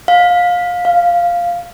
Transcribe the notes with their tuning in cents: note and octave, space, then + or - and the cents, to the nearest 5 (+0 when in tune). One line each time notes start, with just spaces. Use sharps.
F5 +20
F5 -5